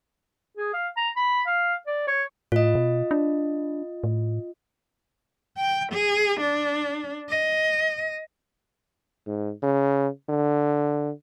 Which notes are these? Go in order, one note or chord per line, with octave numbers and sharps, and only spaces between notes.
G#4
F5
A#5
B5
F5
D5
C#5
A2 F4 D#5
B2
D4
A2
G5
G#4
D4
D#5
G#2
C#3
D3